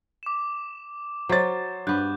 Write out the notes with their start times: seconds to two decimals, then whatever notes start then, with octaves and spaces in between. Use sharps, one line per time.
0.23 D6 E7
1.29 F#3 C5 C#5 A6
1.87 G2 B3 F#6 G6